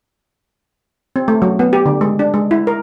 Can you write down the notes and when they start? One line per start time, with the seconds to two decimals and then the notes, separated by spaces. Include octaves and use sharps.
1.16 C4
1.28 A3
1.42 F#3
1.59 B3
1.73 G4
1.86 D3
2.01 G#3
2.19 D4
2.34 G#3
2.51 E4
2.67 A#4